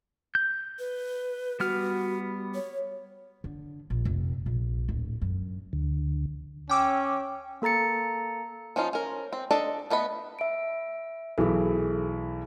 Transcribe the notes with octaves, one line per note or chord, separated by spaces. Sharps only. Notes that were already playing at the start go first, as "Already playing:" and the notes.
G6
B4
G3 B3 F#4 F6
C#5
D3
A#1
F1
A#1
D1
F#2
D2 D3
C#4 G5 D6 E6
A#3 A4 A#5 A6 C#7
F3 C#4 D#4 F4
C#4 A#4
C4
D4 A4 D5 D#5
A3 B3 D#5 B5
E5 D7
B1 E3 G#4 A4